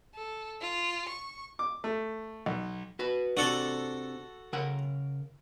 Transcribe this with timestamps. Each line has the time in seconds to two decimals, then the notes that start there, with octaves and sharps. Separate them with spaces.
0.15 A4
0.61 F4
1.09 C#6
1.59 D6
1.84 A3
2.46 B1
2.99 F#4 B4
3.37 C3 D4 F#4 A4
4.53 C#3 A#4 F#5